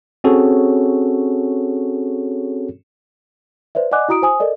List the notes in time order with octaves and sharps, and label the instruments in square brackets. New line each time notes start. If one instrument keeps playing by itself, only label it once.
[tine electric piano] C4 C#4 F#4 G#4 A4 C#5
[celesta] B4 C5 D5 E5
D5 D#5 F#5 G#5 D6 F#6
E4 F#4 A#5 D#6 D7
C5 G#5 D#6
A4 A#4 D5 D#5